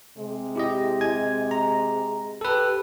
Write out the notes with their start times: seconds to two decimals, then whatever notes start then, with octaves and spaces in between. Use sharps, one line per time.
0.18 C3 G#3
0.55 E4 G4 D#5
1.01 G#5 G#6
1.51 A#5
2.41 G4 A4 B4